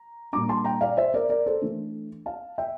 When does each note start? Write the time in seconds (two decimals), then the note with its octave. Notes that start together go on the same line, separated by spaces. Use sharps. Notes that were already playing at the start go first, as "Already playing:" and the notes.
Already playing: A#5
0.32 A#2 G3 D4 A#5 D6
0.49 A5 C6
0.64 G5 A#5
0.81 D5 F5
0.97 C5 E5
1.14 A#4 D5
1.29 A#4 D5
1.46 A4 C5
1.61 E3 A3 D4
2.26 F5 A5
2.58 E5 G5